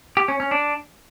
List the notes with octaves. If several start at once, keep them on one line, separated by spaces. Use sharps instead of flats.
G4
C#4
C#4
D4